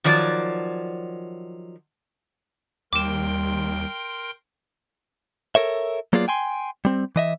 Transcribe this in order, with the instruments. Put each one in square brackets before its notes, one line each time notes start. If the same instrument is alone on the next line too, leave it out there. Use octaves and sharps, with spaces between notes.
[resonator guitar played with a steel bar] D#3 F3 F#3 D5
[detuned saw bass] D#2 [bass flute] G3 [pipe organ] A#4 G5 C6 [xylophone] D6 E7
[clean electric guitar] A4 A#4 C#5 E5
F#3 A#3 B3 F4 G#4 D5
G5 G#5 C6
G3 C4
E3 D#5 E5